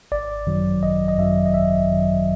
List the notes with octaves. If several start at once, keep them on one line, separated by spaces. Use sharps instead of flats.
G#1 D5
F#2 D#3 F#3
G#1 D#5
D#5
F#2 D#3 F#3 E5
D#5
G#1 E5
F#2 D#3 F#3